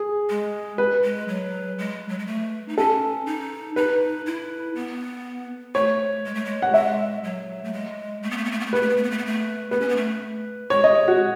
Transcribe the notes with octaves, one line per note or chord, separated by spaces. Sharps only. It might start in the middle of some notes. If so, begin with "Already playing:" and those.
Already playing: G#4
G#3
B4
G#3
F#3
G#3
F#3
G#3
A3
D#4
C#4 A4
D#4
D#4 B4
E4
B3
A3 C#5
G#3
A3
G#3
F#5
G#3 E5
F#3
A3
G#3
A3
B3
A3
B3
A3
B3
A3
B3 B4
A3
B3
A3
B3
A3
B3
A3
B3 B4
C#4
B3
A3
G#3 C#5
D#5
F#4